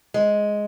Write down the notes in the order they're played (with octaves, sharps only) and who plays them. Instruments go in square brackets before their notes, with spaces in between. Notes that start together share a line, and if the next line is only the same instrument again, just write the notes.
[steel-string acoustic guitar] G#3